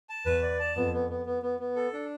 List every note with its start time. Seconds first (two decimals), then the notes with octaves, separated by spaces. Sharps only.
0.09 A5
0.25 E2 B4
0.42 D5
0.60 A5
0.76 F2 B3
0.93 B3
1.10 B3
1.26 B3
1.42 B3
1.59 B3
1.76 A4
1.93 D4